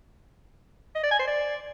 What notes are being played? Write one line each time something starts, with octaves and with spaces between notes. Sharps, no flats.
D#5
D5
G#5
C5
D5